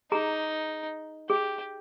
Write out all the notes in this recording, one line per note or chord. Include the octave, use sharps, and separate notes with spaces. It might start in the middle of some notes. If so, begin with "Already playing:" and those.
D#4 G#4 A#5
G4 G#4